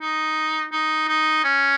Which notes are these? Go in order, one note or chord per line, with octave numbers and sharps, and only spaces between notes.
D#4
D#4
D#4
C#4